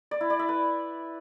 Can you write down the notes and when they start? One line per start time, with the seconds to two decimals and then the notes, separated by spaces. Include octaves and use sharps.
0.11 D5
0.21 E4
0.30 D5
0.39 E5
0.49 B4